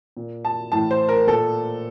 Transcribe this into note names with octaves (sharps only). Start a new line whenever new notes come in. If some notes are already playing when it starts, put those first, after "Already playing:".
A#2
A5
A2 E3 A5
C5
A#4
A#2 A4